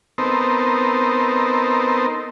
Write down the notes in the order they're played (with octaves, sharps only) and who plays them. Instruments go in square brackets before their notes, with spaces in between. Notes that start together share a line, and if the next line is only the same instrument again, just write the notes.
[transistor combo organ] B3 C4 D#4 A4 A#4 C5